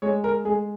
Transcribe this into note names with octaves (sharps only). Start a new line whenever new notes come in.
G#3 C#5
A#4
G#3 G#4